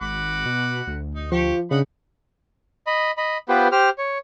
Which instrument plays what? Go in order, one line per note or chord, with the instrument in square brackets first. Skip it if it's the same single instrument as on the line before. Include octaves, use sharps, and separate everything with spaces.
[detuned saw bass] G#1 [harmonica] F#4 B5 D6
[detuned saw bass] B2
D2
[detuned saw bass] D2 [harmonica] D#4
[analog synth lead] F3 [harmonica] G4 C#6
[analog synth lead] C#3 [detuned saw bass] D4 [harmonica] D#4 F#5 B5
[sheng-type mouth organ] D#5 B5
D#5 B5
B3 F4 G4 B4 C5
G4 C5 F6
C#5